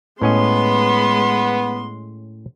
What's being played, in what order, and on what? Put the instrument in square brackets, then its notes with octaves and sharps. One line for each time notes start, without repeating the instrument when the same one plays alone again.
[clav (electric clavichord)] A2 C#4 D#5 [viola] G#3 C6 [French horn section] B3